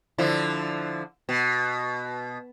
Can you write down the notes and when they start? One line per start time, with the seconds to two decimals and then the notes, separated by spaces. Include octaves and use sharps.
0.18 D3 F3 E4
1.29 B2